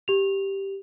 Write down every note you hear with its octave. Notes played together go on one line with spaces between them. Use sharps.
G4 F7